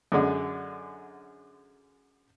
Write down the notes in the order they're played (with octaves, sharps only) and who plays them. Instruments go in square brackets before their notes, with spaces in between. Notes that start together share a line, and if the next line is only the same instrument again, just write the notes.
[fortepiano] F#2 D3 G#3